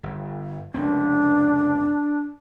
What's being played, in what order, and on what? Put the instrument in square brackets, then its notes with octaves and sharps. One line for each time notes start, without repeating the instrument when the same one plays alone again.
[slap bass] G1
[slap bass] F1 C#2 C4 [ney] D4